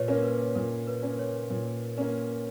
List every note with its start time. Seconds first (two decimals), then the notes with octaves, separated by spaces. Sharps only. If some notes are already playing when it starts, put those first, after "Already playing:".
Already playing: A#2 B4 C#5
0.08 A#3 C#4
0.23 B4
0.55 A#2 A#4
0.87 B4
1.02 A#3 C#4
1.19 C#5
1.50 A#2
1.98 A#3 C#4